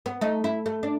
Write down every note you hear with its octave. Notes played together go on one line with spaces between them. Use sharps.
B3
A3 D#4
E4
A3
D4